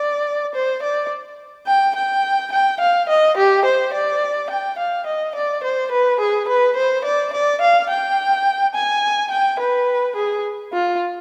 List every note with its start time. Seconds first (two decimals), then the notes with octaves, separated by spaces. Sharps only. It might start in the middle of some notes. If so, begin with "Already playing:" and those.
Already playing: D5
0.55 C5
0.83 D5
1.67 G5
1.96 G5
2.53 G5
2.80 F5
3.09 D#5
3.37 G4
3.65 C5
3.94 D5
4.50 G5
4.79 F5
5.07 D#5
5.36 D5
5.64 C5
5.92 B4
6.20 G#4
6.48 B4
6.76 C5
7.05 D5
7.33 D5
7.62 F5
7.90 G5
8.75 G#5
9.31 G5
9.60 B4
10.16 G#4
10.73 F4